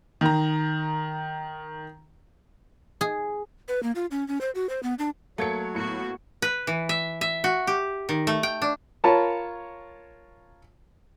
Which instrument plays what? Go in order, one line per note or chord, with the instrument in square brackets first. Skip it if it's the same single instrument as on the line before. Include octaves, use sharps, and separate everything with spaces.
[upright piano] D#3 A#5
[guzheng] G#4
[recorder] B4
A#3
F4
C#4
C#4
C5
F#4
C5
B3
D4
[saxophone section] F#3 [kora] A3 A4 [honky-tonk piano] A#3 G#6 C#7
[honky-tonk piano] A2 C#7 [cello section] A#3 B3 F#4
[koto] B4
E3
E5
E5
F#4
G4
D#3
A3
G5
D4
[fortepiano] F4 A#4 C#5 A5 B5